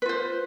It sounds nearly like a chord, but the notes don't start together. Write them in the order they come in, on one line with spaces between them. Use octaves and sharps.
B4 F4 C5